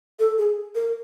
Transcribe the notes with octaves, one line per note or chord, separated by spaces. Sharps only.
A4
G#4
A#4